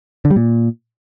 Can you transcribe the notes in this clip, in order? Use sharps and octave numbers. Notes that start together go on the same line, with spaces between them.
D3
G3
A#2